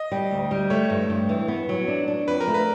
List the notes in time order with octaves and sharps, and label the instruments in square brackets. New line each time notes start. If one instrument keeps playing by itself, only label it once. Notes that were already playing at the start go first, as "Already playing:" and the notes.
Already playing: [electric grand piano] D#5
[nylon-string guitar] G3
D2
G3
[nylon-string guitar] A3 [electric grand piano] C#5
[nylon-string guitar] G2
G2
E3
B3
F#3
D4
D4
[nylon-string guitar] F2 [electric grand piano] B4
[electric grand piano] A#4
[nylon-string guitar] A3
[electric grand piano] B4